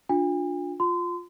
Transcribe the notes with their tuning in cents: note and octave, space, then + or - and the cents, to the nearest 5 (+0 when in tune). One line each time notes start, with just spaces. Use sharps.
D4 +0 F4 +30 G#5 -45
F4 +10 C6 -30